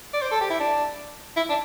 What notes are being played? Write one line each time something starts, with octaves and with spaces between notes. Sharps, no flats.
D5
C5
A4
G4
E4
D4
E4
D4